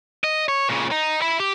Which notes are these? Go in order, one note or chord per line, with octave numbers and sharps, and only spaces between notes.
D#5
C#5
A#2 C#3
D#4
E5 B5
G4